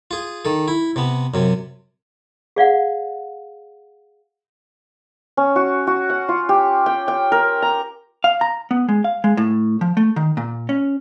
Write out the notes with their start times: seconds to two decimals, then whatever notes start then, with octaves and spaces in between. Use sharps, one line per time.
0.11 F4 G#4
0.45 D#3 A4
0.68 E4
0.96 C3 B3
1.34 F#2 C3
2.56 G#4 D5 F5 F#5
5.37 C#4
5.56 F#4
5.87 F#4
6.10 F#5
6.29 F4
6.49 G4
6.86 G5
7.08 G5
7.32 A#4
7.62 A#5
8.24 F5
8.41 A#5
8.71 B3
8.89 G#3
9.04 F5
9.24 G#3
9.37 A2
9.81 F3
9.97 A3
10.16 D#3
10.37 A#2
10.69 C#4